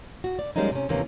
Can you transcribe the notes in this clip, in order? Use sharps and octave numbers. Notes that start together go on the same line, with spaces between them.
F#4
D5
F3 G3 G#3 A#3 C#4 D#4
C3 C#4
D#2 C3 E3 A#3 C#4